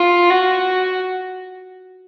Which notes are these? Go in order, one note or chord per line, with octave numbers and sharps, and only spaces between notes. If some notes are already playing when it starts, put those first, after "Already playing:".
Already playing: F4
F#4